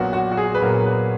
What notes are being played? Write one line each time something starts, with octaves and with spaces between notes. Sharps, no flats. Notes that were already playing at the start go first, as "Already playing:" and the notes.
Already playing: A#1 A#2 F#3 B3 F#4
F#4
F#4
G#4
B4
A#1 A#2 F#3 B3 A#4
B4